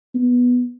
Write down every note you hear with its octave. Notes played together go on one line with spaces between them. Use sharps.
B3